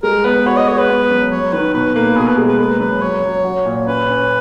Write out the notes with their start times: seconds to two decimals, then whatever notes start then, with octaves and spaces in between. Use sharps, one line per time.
0.03 G#3 A#4
0.24 B3 B4
0.46 F#4 C#5
0.57 D#5
0.68 G#3 C#5
0.78 B4
0.89 B3
1.10 F#2
1.32 F#3 C#5
1.53 D#3 B4
1.74 B2 B4
1.95 A#3 B4
2.16 B2 G#4
2.27 B4
2.38 G#3
2.48 B4
2.59 A#3 B4
2.80 F#2 B4
3.02 F#3 C#5
3.23 F#3
3.45 F#4
3.66 A#2
3.87 C#4 B4
4.08 C#4